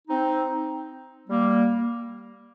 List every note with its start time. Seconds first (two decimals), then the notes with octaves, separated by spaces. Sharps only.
0.08 C4 D#4
1.28 G3 A#3